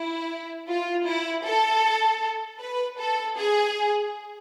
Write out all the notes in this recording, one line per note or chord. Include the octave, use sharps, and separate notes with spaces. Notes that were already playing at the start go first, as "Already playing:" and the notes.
Already playing: E4
F4
E4
A4
B4
A4
G#4